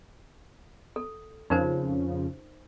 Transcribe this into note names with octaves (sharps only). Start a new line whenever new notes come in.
A4
F2 C#3 F3 D#4 A#4 C5